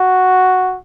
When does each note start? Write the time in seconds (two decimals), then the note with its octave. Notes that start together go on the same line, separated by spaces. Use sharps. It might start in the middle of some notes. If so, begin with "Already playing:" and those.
Already playing: F#4